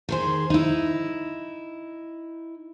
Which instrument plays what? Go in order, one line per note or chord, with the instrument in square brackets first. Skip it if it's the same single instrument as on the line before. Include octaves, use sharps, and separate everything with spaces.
[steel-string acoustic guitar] D#3 G#4 C5
D#4 E4